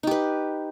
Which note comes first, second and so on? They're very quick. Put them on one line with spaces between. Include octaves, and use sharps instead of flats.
D#4 G4 B4